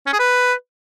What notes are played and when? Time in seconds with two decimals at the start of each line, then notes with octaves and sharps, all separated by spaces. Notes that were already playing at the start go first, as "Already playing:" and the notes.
0.06 C#4
0.13 G#4
0.19 B4